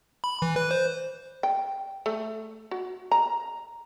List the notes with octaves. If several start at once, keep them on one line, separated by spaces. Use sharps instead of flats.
B5
E3
B4
C5
G5
A3
F#4
A#5